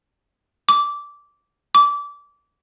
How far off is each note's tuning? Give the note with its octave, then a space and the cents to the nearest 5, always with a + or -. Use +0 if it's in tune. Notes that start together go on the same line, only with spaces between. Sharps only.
D6 -15
D6 -25